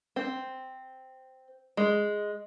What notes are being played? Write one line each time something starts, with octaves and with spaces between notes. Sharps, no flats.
C4
G#3